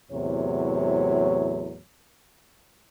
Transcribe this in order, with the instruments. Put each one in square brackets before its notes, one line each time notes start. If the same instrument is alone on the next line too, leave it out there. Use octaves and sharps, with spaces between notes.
[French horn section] E2 A2 C3 F#3 C#5